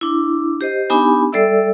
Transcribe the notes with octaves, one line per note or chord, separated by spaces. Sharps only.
D4 E4
G4 C5 D#5
B3 D4 D#4 G4 G#5 B5
G3 A4 D5 E5 E6